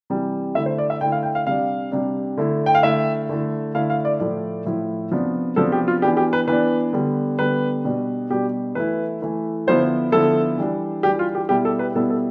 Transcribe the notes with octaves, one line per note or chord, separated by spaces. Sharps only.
C3 E3 G3
D3 A3 E4 E5
C5
D5
E5
D3 A3 E4 G5
F5
G5
F5
C3 G3 D4 F5
C3 G3 D4
D3 A3 E4
G5
F5
D3 A3 E4 E5
D3 A3 E4
D3 A3 E4 F5
F5
D5
A2 F3 A3 E4 D5
A2 F3 A3 E4
C3 F3 B3 D4
C3 F3 B3 D4 A4
G4
F4
E3 B3 D4 G4
G4
B4
E3 B3 D4 B4
D3 G3 B3
D3 G3 B3 B4
B2 G3 D4
B2 G3 D4 G4
E3 A3 E4 B4
E3 A3 E4
D3 F3 B3 E4 C5
D3 F3 B3 E4 A4
E3 G3 D4
E3 G3 D4 G4
F4
G4
B2 G3 B3 E4 G4
A4
B4
B2 G3 B3 E4 A4
A4